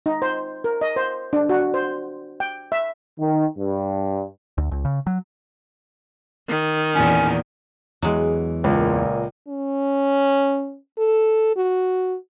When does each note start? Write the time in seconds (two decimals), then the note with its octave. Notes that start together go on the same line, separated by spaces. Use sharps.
0.06 D#4
0.22 C5
0.64 A#4
0.81 D#5
0.96 C5
1.33 D4
1.49 F#4
1.74 C5
2.40 G5
2.72 E5
3.19 D#3
3.58 G2
4.58 D2
4.71 C#2
4.85 C#3
5.07 F#3
6.48 D#3
6.95 E2 A#2 C#4
8.02 E2 E3 F#3 G#3
8.64 C#2 A#2
9.48 C#4
10.98 A4
11.56 F#4